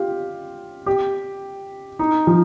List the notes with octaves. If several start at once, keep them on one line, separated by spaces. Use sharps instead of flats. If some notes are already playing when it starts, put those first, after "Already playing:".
Already playing: F4 G4
G4
D#4
F3